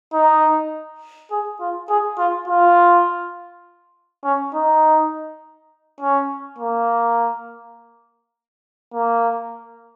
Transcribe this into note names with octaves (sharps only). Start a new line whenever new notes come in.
D#4
G#4
F4
G#4
F4
F4
C#4
D#4
C#4
A#3
A#3